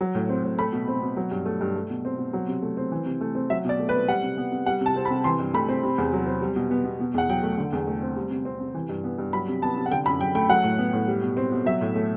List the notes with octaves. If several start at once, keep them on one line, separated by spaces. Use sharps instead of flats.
F#3
A2
C4
A2
A3 B5
B2
C4
B2
F#3
G2
A3
G2
A3
B2
C4
B2
F#3
C3
A3
C4
E3
C3
A3
C4
F#3 E5
B2 D5
A3
B4
C4
G3 F#5
C3
B3
C3
G3 F#5
C3
A5
C4
B5
C3
E3 C6
G2
A3 B5
C4
C3
E2
F#3
C4
G3
B2
B3
B2
B2
E2 F#5
F#3 G5
A3
D3
E2
A3
C4
G3
C3
C4
C3
E3
G2
B3
G2
F#3 B5
C3
B3 A5
C3
F#5
D3 G5
F#2 B5
F#3 G5
A3 G5
F#3 F#5
A2
B3
A2
G3
B2
C4
B2
F#3 E5
A2
A3